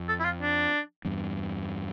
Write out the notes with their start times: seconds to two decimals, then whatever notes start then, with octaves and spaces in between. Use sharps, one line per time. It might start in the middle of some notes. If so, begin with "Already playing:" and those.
Already playing: F2
0.08 A4
0.20 E4
0.24 F4
0.41 D4
1.05 E2 G2